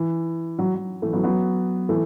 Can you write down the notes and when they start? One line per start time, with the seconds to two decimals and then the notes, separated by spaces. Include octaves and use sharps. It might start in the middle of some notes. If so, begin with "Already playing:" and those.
Already playing: E3
0.59 F#3
0.75 F#3
1.02 E3 A3
1.13 F#3 B3
1.23 F#3 B3
1.89 E3 A3